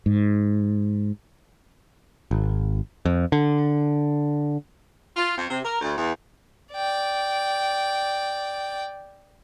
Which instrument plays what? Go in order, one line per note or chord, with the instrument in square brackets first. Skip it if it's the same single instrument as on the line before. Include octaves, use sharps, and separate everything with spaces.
[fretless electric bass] G#2
[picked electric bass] G#1
F2
D3
[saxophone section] F4
F2
C3
A#4
D2
E2
[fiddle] D5 G5